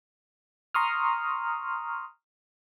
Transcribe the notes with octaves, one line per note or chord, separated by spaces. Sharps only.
A#5 C6 C#6 D#6 F6